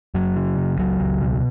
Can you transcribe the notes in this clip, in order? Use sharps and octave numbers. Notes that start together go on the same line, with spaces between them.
F#1 F#3
C#3
F#1
C#2 F#3
C#2
B2